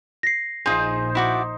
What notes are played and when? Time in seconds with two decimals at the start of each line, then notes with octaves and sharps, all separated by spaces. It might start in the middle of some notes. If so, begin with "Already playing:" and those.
0.23 A#6 C7
0.66 A#1 D#4 F4 G#4 C5
1.15 E4 F#4 D5